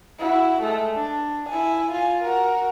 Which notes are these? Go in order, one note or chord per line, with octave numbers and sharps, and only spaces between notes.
E4 F#4
G#3 A3
D4
E4 G#5
F4 G#5
F#4 A#4